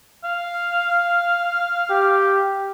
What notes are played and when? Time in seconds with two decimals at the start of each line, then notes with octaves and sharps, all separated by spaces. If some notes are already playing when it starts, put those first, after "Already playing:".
0.24 F5
1.90 G4